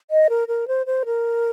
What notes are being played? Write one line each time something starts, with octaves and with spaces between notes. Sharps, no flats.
D#5
A#4
A#4
C5
C5
A#4